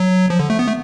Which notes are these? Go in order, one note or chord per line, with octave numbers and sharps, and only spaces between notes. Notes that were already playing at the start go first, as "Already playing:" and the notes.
Already playing: F#3
F3
D3
A3
B3
A3